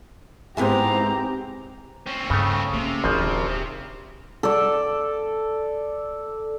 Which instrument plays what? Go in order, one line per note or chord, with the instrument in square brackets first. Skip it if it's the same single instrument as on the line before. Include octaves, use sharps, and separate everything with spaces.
[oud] G#2 B3 E4 [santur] G#3 C5 [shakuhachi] C4 [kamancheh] G4 A#5
[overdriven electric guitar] C4 C#4
[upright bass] G2 [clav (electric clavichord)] C#3 A3
[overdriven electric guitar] C3 [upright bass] A#3 C#4
[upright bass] D#1 D4 [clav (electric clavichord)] G#1 C#3 F3
[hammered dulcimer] A4 D5